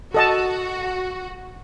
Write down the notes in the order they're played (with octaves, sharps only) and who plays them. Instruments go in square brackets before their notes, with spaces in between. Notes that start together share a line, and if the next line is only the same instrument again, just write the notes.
[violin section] F#4 [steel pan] A4 D#5 A5